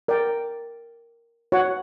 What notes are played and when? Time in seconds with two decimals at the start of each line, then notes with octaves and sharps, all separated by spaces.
0.08 A#4 D5 G5
1.52 F#4 C#5 F#5